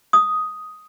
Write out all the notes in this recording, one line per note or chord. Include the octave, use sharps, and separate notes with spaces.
D#6